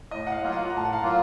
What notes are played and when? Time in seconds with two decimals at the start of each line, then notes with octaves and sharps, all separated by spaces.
0.11 A2 D#5
0.27 F#5
0.32 F5
0.42 F#3 A#3 F4
0.52 F#5
0.70 A#5
0.73 A2 A5
0.85 F#5
0.93 F5
1.03 F#3 A#3 F4